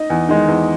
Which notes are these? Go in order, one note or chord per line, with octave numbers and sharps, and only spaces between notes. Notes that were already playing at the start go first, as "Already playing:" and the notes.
Already playing: D#4 D#5
E2
D#3 G#3
E2